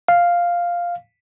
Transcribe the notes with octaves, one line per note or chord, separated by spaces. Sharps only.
F5